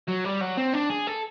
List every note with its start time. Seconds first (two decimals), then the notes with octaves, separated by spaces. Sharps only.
0.08 F#3
0.25 G3
0.41 F#3
0.58 C4
0.74 D4
0.90 G#4
1.07 A4